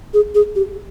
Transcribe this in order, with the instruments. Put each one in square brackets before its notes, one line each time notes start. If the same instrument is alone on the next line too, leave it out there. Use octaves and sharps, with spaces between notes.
[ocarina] G#4
G#4
G4